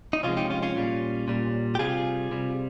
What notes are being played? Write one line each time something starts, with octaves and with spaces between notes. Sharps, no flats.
D#4
C3 F3 G#3 C#4 F4
D#4 G4
C#4 F4
C#4 F4
A#2 G3
A#2 G3
G4
C3 G3 F4 G#4
C3 G3